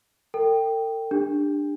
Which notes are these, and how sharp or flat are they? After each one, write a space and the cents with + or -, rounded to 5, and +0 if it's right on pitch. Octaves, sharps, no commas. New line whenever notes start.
A4 +45 G5 +0
D4 +10 G4 +35